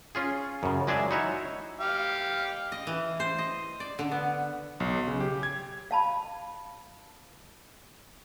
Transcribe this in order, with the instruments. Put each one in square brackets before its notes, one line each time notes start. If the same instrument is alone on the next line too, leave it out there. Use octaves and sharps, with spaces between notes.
[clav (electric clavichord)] C#4 F4 G#4
F#2 C#3
F#3 G#3 G#4 D5 E5 A5
D#4 E4 F#4 C#5 E5
[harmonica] G4 F5
[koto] D#5
E3
C5
D#5
D5
D3
B3
[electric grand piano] B1
C#3
G4
G#6
[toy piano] F5 A5 B5